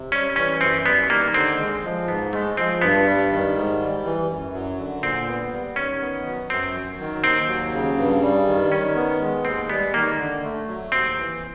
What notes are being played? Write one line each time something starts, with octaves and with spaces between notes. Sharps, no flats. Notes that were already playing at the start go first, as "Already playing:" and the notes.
Already playing: C3
G3 C#4
E3 C#4
F#2 C4
G3 B3
D#3 A#3
D3 C4
G#3
F3
G#2 B3
G#3 A3
F3 C4
G2 B3
G3
D#3
G#2
G3
E3
F#2
F#3
D3
A#2 C4
B3
G3
D#3 C#4
B3
F#3
F#2 C4
F#3
D#3
D#2 C4
F#3
C#3
G2
G3
D#3
D#3 C#4
B3
G#3
D#2 C4
G3 B3
D#3 A#3
D3
A3
F#3
D#2 C4
E3